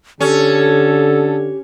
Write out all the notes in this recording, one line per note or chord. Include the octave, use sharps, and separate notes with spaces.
D3 C#4 G4 A4